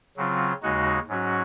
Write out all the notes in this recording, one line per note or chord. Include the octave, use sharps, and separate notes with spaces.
C#3 F#3 C4 F4
D#2 C#3 G#3 D#4 F#4
G#2 F#3 C#4 F#4